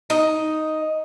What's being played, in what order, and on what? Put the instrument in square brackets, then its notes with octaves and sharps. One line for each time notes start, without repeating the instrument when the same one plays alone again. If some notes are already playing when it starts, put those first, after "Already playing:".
[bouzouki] D#4